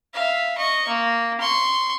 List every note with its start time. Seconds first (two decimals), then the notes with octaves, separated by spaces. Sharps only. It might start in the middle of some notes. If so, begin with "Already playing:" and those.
0.13 E5 F5
0.57 D#5 C#6
0.88 A#3
1.40 C6 C#6